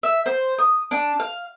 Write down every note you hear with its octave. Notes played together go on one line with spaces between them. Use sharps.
E5
C5
D#6
D4
F5